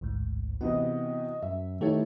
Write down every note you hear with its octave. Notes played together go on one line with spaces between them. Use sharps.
A1 D2 G#2
C3 E3 B3 F#4 D#5
F#2 E5
D#3 A3 D#4 E4 G4 A4 C#5